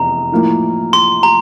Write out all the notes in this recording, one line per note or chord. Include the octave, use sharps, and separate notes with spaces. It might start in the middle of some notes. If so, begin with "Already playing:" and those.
Already playing: F1 E2 A#5
A2 F3 A#3 E4
C6
A#5